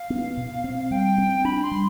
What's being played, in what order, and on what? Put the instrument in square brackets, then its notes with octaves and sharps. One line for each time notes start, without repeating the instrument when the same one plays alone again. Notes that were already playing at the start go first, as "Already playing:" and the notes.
Already playing: [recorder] F5
[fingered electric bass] B3
B2
C4
[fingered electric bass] G3 [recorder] G5
[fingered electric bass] C4
[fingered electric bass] D4 [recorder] B5
[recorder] C6
[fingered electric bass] G3